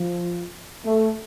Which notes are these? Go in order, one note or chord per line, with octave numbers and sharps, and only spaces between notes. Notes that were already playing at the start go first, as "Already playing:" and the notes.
Already playing: F3
A3